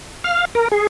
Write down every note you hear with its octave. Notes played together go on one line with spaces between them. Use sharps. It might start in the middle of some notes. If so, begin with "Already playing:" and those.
F5
A#4
G#4